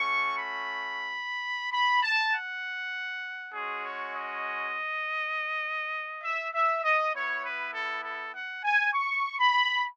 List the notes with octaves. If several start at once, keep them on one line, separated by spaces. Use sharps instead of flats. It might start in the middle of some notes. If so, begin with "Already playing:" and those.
Already playing: A3 C#4 F#4 C#6
B5
B5
A5
F#5
G#3 C#4 F#4 G#4
C#5
D#5
E5
E5
D#5
B3 E4 C#5
B4
A4
A4
F#5
G#5
C#6
B5